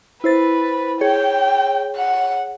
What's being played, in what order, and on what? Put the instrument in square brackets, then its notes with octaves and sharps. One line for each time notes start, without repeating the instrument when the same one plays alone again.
[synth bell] E4 C5 A6 [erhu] B4
[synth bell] G#4 C#5 [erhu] G5
[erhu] F#5